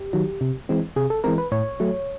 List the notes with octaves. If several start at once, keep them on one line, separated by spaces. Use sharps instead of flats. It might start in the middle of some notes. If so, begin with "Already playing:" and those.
Already playing: G4
D#3 F#3
C3
E3 G#3 C4
C3 G#4
A4
E3 G#3 C4 A#4
B4
A2 C#5
F#3 A3